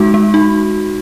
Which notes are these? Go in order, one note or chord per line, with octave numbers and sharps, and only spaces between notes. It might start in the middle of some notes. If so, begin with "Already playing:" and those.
Already playing: G#3 D#4 F#4
G#3
D#4